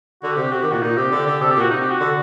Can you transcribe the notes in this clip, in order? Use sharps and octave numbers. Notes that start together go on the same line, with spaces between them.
D3 F#4
G4
C3
G4
C3 F#4
D#3 G4
A#2 F#4
A#2 D#4
C3 G4
D3
D3
C3 A4
G4
A#2 F#4
C3 D#4
G4
F#4
D3